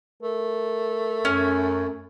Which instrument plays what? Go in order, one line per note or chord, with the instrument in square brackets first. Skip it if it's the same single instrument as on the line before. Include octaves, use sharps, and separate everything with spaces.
[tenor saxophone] A3 [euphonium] A#4
[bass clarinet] F#2 [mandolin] C#4 G#5